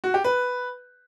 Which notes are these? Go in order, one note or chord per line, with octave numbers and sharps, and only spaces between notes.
F#4
G4
B4